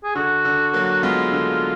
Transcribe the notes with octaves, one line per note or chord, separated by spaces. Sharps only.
G#4
D3 F#4
D3
F#3 A#3
G#3 B3 F4
D3